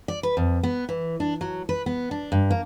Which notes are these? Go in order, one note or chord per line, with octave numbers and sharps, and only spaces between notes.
D5
B4
F2
B3
E3
D4
F#3
B4
B3
D4
G2
A#3